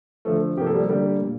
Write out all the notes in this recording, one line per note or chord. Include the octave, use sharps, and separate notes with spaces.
D3 F3 A3 A4
C3 F3 A#3 G4
A4
G3 G4
D3 G3 A#3 G4
A#2